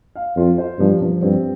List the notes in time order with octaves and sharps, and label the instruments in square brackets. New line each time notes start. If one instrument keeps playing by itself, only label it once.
[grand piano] F5
[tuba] F2 [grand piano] F4
[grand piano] C5
[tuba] G2 [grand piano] F3
[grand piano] F3
[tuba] G2 [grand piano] C4